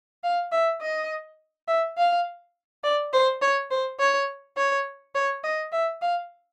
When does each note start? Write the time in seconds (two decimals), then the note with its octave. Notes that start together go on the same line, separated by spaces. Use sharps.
0.24 F5
0.52 E5
0.81 D#5
1.68 E5
1.97 F5
2.84 D5
3.13 C5
3.41 C#5
3.71 C5
3.99 C#5
4.57 C#5
5.15 C#5
5.44 D#5
5.72 E5
6.01 F5